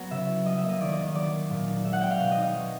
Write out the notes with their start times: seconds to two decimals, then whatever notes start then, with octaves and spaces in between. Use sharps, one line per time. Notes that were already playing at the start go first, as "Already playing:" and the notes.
Already playing: F#3 B3 A#5
0.11 C#3 E5
0.28 E4
0.45 G3 D#5
0.58 E5
0.63 A#3
0.69 D#5
0.80 D#3 D5
0.92 D#5
0.97 D#3
1.03 D#5
1.15 F#3 D5
1.32 A#3
1.50 A#2
1.67 D#4
1.84 G#3 E5
1.93 F#5
2.01 C4 G5
2.11 F5
2.19 B2
2.31 D#5
2.37 D#4
2.42 D#5
2.54 F#3